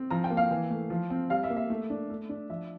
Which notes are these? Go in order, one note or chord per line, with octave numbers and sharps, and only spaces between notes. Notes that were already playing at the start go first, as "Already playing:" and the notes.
Already playing: C4
F3 A#5
G5
A#3
F5
E3
A3
F3
C4
G3 F5
E5
A#3
E5
A3
D4
A3
D4
F3 E5